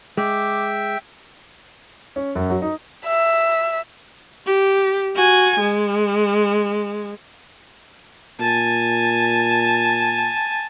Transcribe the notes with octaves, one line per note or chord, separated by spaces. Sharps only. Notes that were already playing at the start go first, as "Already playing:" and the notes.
G#3 E5 G5 D6
C#4
F#2
F#3
D#4
E5
G4
F#4 G#5
G#3
A#2 G#5 A5